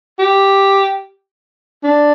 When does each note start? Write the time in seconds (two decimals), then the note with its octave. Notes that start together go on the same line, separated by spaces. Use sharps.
0.19 G4
1.84 D4